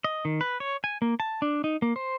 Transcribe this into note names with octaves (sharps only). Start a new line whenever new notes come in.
D#5
D#3
B4
C#5
G#5
A#3
A5
D4
D#4
A#3
C5